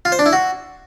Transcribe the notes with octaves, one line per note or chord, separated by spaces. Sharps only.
F4
C5
D4
E4
F#4